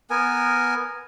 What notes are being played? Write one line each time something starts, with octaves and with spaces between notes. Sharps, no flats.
B3 A#4 G#5